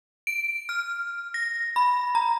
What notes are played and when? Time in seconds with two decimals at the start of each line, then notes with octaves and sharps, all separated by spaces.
0.27 D7
0.69 F6
1.34 A#6
1.76 B5
2.15 A#5